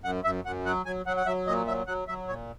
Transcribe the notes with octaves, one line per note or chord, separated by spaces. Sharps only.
F#2 F#5
F#2 E5
F#2 F#5
F#3 F#5
F#3 G#5
F#3 F#5
F#5
F#3 E5
A#2 D#5
F#3 E5
F#3 F#5
F#3 E5
A#2 C#5